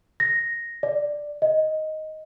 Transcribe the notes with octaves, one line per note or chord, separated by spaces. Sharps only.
A#6
D5
D#5